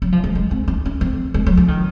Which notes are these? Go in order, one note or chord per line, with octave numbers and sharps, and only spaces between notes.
F#3
F3
G#3
G#3
C4
D#4
C#4
C4
G#3
F#3
F3
D#3